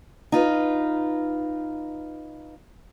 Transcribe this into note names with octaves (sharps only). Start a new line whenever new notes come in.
D#4 F4 B4